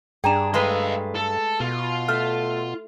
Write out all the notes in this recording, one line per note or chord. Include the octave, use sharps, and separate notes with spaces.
G2 D4 G#4 G5 A#5 E7
G#3 A3 B4 D#5 F5
A4
B2 F4
A3 F6